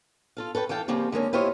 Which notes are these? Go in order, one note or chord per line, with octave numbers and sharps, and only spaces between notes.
F4 A4 F5
A4 B4 C#5 G5
E3 A4 F5 G5 A5
C#3 F3 G3 A#3 C4 G4
D3 G#3 A#3 C#4
E4 F4 G4 C5 C#5 D#5